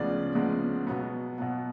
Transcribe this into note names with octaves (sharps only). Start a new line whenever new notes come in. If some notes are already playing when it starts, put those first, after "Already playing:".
Already playing: D2 C#3 F3 G#3 B3 D5
D2 C#3 F3 G#3 B3
B2 F#3 B3
B2 F#3 B3